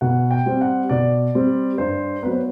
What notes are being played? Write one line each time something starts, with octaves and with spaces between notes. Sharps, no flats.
B2 F#5
G5
G3 C4
F#5
B2 D5
G3 C4
G2 C5
F#3 B3 B4
C5